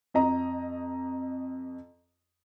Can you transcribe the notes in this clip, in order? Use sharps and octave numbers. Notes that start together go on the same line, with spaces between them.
F2 D#5 A#5